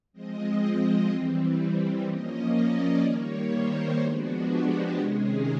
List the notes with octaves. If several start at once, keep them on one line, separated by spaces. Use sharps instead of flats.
F3 G#3 C4 D#5
D#5
E3 G3 C4
F3 A#3 C#4 D#5
D5
D#3 G3 A#3 C#5
C5
F3 G#3 B3 D4 F#4
G4
C3 D#3 G#3 C#4 G#4